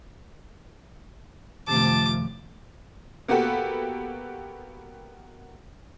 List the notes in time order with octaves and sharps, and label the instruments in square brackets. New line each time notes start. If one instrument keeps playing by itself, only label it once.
[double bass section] F#2 C3 F3 [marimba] D#3 A3 [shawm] A5 [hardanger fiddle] D6
[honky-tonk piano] A#3 B3 F#4 G4 A4 B4